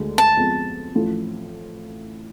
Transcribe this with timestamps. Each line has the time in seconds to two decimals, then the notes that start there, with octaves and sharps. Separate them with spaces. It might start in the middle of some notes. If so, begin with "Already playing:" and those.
Already playing: D2 D3 G#3
0.18 A5
0.37 F2 F3 G#3 B3
0.94 A1 A2 F3